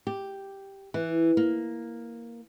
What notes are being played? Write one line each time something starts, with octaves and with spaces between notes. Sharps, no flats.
G4
E3
A#3